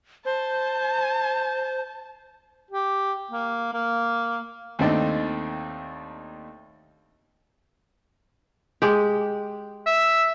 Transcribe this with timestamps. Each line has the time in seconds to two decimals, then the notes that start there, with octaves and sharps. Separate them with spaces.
0.25 C5 A5
2.71 G4
3.31 A#3
3.73 A#3
4.79 D#2 A3 C4 D4 D#4
8.82 G#3 G4
9.86 E5